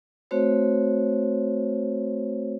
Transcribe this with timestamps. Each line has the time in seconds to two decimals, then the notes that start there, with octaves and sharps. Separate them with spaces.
0.31 A3 C4 F#4 C5 C#5